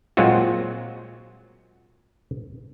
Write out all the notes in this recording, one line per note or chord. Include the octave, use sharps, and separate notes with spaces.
A#2 F#3 G#3 C4 F4 F#4